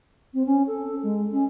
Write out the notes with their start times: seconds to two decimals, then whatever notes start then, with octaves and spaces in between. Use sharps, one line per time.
0.33 C4
0.46 C#4
0.67 A4
1.03 G#3
1.32 C#4